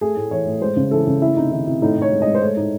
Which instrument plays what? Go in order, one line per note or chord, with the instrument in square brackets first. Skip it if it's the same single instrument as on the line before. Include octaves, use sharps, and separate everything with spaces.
[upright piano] A3 G#4
A2
E3 C#5
A2
G#3 C5
C#3
E3 A4
C#3
A3 E4
C3 D#4
D#3 E4
C3 E4
A2 D#4
A2
C#5
G#3
G#3 D#5
C5
A3 C#5
A2 D#4